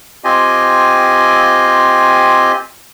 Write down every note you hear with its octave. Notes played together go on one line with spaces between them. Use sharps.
C4 F4 G4 D#5 G#5